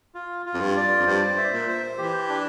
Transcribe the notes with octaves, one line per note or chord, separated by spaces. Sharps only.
F4
F4
F2
G2
D5
F2
G2 C5
E5
A#2
C5
E3 G4
D4